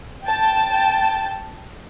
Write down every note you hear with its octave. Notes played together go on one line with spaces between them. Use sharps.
G5 A5